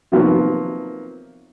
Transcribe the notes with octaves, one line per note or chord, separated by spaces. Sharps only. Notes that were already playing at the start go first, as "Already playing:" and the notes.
C3 D#3 F3 F#3 A#3 B3